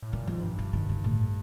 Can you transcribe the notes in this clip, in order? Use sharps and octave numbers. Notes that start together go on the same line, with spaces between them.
A2
A#2 E3
G#2 F3
G2
E3
D#3
D3
A2